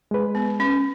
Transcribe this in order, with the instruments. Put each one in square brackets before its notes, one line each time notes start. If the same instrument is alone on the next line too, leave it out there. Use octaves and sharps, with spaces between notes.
[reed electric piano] G#3 B4
[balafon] B3
C#4